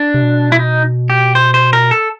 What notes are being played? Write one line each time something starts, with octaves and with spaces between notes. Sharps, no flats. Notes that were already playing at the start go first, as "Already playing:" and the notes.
Already playing: D4
C3
B2
E4
D#4
G4
C5
C5
A#4
A4